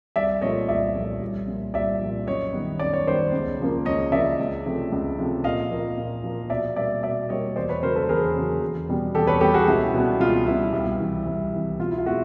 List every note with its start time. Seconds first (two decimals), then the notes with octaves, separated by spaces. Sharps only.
0.16 C2 D5 E5
0.41 A#2 F3 A3 C#5 D#5
0.69 C2 D5 E5
0.95 A#2 F3 A3
1.21 C2
1.48 A#2 F3
1.74 C2 D5 E5
2.01 A#2 F3
2.27 F#2 C#5 D#5
2.53 D#3 G3 B3
2.80 F#2 D5
2.93 C#5
3.07 D#3 G3 B3 C5 D5
3.32 C#2
3.60 C#3 F3 A#3
3.85 C#2 C#5 D#5
4.12 C#3 F3 A#3 D5 E5
4.39 C#2
4.66 C3 F3 A3
4.92 C#2
5.19 C3 F3 A3
5.44 A#2 D#5 F5
5.71 F3 A#3
5.98 A#2
6.24 F3 A#3
6.50 B2 D5 E5
6.76 G3 A#3 D5 E5
7.03 B2 D5 E5
7.29 G3 A#3 C#5 D#5
7.56 E2 C5 D5
7.69 B4 C#5
7.82 C#3 F#3 A#3 A#4 C5
7.96 A4 B4
8.09 E2 G#4 A#4
8.35 C#3 F#3 A#3
8.61 E2
8.89 B2 G3 B3
9.15 E2 G4 A4
9.27 B4 C#5
9.41 B2 G3 B3 G4 A4
9.54 F#4 G#4
9.67 C#2 E4 F#4
9.94 B2 G3 B3
10.20 C#2 F4
10.46 B2 G3 B3 E4
10.73 C2
11.00 C3 E3
11.26 C2
11.53 C3 E3
11.79 B2 F4
11.91 E4
11.98 F4
12.05 G#3 B3 E4 F#4